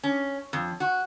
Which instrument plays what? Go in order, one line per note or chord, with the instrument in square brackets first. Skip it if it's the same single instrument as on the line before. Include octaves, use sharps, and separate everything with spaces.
[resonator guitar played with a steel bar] C#4
F2
F#4